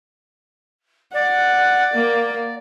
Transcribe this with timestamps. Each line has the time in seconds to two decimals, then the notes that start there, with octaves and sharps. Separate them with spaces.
1.14 D5 F#5
1.94 A#3